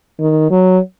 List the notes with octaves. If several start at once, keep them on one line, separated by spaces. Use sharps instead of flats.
D#3
F#3